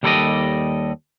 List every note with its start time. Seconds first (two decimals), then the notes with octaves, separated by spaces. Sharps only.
0.03 D#2 G3 A4 C5 D5 D#5